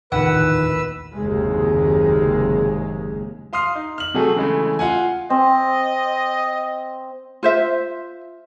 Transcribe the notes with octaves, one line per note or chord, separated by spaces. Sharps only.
D1 A#1 E2 D#3 B4 F#5 E6
F#1 D#2 C3 G#3
F5 C6 D#6 F6 C7
D#4
F6 F#7
C3 F#3 A3 G#4 A4
C#3 E3 G#3 A3
F4 F5 F#5 G#5
C4 D#5
F4 C5 E5